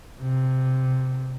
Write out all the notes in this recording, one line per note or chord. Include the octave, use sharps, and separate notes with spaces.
C3